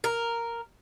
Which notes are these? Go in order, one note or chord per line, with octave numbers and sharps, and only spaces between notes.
A#4